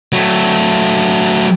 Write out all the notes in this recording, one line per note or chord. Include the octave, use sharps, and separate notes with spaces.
F#3 A3